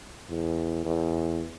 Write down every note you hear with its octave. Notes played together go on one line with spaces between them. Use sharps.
E2
E2